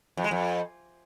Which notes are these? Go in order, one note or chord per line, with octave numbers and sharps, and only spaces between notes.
F2
G#3
F2